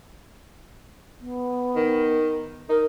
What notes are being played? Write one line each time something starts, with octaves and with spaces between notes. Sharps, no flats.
B3
D#3
D#4 A#4